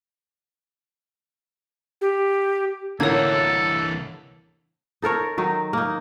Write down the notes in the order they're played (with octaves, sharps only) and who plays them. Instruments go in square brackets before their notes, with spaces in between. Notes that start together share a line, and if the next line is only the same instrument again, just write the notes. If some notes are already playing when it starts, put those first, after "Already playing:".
[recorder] G4
[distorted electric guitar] C2 E3 [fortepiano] A2 D3 A#3 [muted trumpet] A4 [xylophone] C#5 G#6
[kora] D#4 A4 A#4 C#5
D#3 F#3 D#4
A#3 D#4